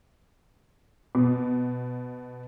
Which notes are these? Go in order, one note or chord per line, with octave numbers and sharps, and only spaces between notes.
B2